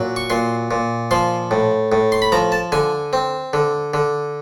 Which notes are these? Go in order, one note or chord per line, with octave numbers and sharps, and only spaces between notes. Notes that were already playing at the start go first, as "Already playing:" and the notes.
Already playing: A#2 F#3
C#6
A#2 C6
A#2
F3 C6
A2
A2
C6
B5
F3 A#5
A5
D3 G#5
C4
D3
D3